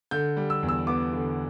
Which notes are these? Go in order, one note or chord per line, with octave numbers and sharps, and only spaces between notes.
D3 G6
G3
E6
E2
E6
B3 D6
D3